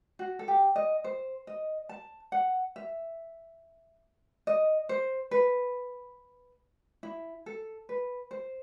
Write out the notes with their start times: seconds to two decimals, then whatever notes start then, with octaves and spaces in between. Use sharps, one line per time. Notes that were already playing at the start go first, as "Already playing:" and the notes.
0.19 F#4
0.39 A4
0.48 G4
0.76 D#5
1.04 C5
1.47 D#5
1.89 A5
2.32 F#5
2.76 E5
4.47 D#5
4.89 C5
5.31 B4
7.03 E4
7.46 A4
7.89 B4
8.31 C5